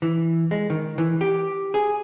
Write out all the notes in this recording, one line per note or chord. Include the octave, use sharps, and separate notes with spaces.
E3
G#3
D#3
E3
G4
G#4